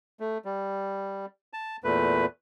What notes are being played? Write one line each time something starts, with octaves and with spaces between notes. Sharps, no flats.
A3
G3
A5
E2 A#2 A3 B4